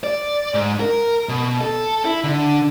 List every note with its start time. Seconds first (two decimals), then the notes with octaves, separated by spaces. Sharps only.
0.04 D5
0.54 G#2
0.80 A#4
1.29 B2
1.61 A4
2.05 E4
2.24 D3